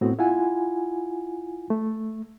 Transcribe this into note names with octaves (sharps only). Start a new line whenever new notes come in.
A2 B3 C4 F#4
E4 F4 F#5 G#5
A3